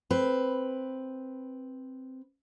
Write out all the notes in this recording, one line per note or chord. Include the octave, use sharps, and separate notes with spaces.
C4 B4